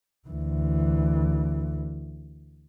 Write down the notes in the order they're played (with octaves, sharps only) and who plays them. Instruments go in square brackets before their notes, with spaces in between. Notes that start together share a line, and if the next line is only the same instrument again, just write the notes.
[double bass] D2 E3